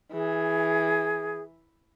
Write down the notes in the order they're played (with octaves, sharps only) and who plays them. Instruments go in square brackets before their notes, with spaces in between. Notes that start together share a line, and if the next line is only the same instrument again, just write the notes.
[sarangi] E3 [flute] G#4